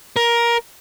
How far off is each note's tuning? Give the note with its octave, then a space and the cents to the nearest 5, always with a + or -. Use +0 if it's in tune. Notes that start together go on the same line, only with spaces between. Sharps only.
A#4 +15